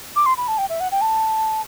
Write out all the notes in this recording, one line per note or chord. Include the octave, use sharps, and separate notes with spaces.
D6
C6
B5
A5
G5
E5
F#5
G5
A5